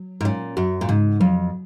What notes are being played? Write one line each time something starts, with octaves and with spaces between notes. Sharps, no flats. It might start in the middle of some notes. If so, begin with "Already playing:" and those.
Already playing: F#3
G#2
A#2 C#4
F#2 F#4
A#2
G#2 C#3
F2 F#3